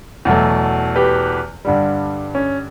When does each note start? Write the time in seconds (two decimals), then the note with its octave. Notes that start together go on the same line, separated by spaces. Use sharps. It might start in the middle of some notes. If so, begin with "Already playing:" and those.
0.25 E2 B2 F#3 A3
0.96 G4 B4
1.65 G2 D3 G3
2.35 C#4